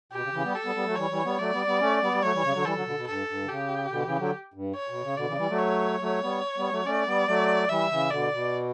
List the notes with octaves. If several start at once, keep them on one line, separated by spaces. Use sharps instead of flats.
B2 G4
C#3
C#3 E3
G3 B3
A4
G3 B3
G3 B3
F#3 A3
E3 G3 C#5
E3 G3
G3 B3
F#3 A3 D5
G3 B3
G3 B3
A3 C#4
G3 B3
G3
F#3 A3 C#5
E3 G3
C#3
G3
D3 F#3
E3 G3 A4
D3 F#3
B2 D3
B2
G2 A4
G2
D3
C#3 G4
B2 D3
C#3 E3
D3 F#3
G2
C#5
B2
C#3
B2 D3 D5
C#3 E3
E3 G3
F#3 A3
C#5
F#3 A3
G3 B3
G3 B3
F#3 A3
A3 C#4 D5
G3 B3
F#3 A3
E3 G3 E5
C#3 E3
B2 D3 D5
B2